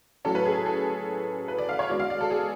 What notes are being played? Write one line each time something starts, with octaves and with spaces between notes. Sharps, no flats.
A2 F#3 C#4 A4
B4
G#4
A4
A4
B4
D5
F5
C#5
B2 G#3 D4 D5
F5
D5
A4
G#4